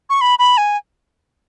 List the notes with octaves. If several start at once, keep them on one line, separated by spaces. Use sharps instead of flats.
C#6
B5
B5
G#5